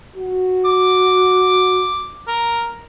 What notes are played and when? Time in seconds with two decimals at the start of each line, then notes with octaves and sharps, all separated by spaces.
0.16 F#4
0.65 D6
2.28 A#4